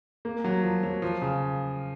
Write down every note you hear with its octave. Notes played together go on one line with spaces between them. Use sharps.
A#3
F#3
F3
F#3
F3
C#3